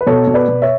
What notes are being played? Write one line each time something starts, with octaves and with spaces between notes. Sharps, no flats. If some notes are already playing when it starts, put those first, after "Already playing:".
B4
B2 A4 C#5
B2
B4 D5
B2
C#5 E5